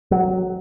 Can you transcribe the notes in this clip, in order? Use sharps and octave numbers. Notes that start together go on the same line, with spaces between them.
F#3